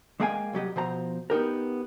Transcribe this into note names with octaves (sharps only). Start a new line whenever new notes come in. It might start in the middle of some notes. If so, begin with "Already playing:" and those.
G#3 A#3 G#4 F5 G5 G#5
C2 F#3 G4 D#5
B2 F3 C5 A#5
B3 D#4 G4 A#4